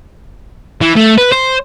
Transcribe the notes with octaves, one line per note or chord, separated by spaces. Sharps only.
E3
A3
B4
C5